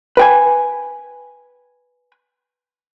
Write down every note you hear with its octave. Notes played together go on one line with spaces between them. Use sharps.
B4 G5 G#5